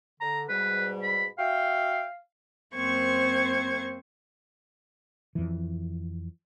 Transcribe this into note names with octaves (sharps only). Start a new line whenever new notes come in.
D3 A#5
G#2 B2 G3 B4
B5
F#4 E5 F5 G5
F#2 A#3 C4 C5 C#6 G#6
F2 E3